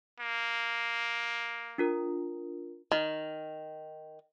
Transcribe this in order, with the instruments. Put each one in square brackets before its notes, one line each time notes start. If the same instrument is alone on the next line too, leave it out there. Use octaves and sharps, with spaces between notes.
[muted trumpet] A#3
[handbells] D4 F4 A#4
[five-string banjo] D#3